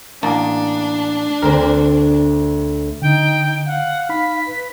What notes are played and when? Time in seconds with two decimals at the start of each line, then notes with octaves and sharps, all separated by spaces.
0.23 A1 A#3 D4 A5
1.42 D2 C4 A#4
3.02 D3 D#4 G5
3.67 F5 F#5
4.09 D#4 B5 B6
4.47 B4